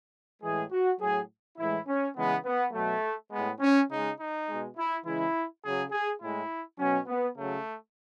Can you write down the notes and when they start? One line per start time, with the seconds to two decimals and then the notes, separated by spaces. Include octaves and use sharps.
0.42 A2 E3 G#3 G#4
0.72 F#4
1.00 A2 F#3 G#4
1.58 A2 E3 G#3 E4
1.88 C#4
2.16 C#3 E3 G#3 B3
2.45 B3
2.73 B2 F#3 A3
3.31 A2 G#3 B3
3.60 C#4
3.89 C#3 G#3 D#4
4.19 D#4
4.48 B2 G#3
4.77 E4
5.05 C#3 E3 G#3 E4
5.63 C#3 F#3 G#4
5.91 G#4
6.21 A2 G#3 E4
6.78 B2 F#3 C#4
7.07 B3
7.36 C#3 F#3 A3